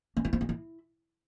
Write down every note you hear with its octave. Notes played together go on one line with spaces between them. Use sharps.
C#4
E4
C4
D#4
E4